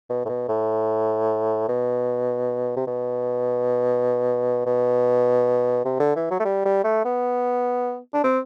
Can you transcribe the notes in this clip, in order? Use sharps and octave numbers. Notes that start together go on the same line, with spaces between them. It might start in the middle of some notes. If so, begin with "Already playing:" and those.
B2
A2
B2
A2
B2
C3
B2
B2
C3
D3
E3
F#3
A3
G3
G3
A3
B3
D4
C4